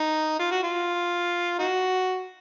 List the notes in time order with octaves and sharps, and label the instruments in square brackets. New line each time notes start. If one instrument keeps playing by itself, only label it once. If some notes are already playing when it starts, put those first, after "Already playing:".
Already playing: [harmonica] D#4
F4
F#4
F4
D#4 F#4